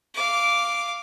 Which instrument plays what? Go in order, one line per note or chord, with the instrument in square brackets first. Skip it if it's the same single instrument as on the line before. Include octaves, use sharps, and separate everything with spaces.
[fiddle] F5 D6